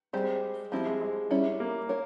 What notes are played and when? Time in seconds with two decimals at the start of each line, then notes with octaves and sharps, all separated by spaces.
0.13 G3 G#3 C4 G4 C5
0.72 F3 G3 C4 E4
0.86 G#3
1.01 G#3
1.31 G3 C#4 E4
1.60 A#3
1.89 A#4 C#5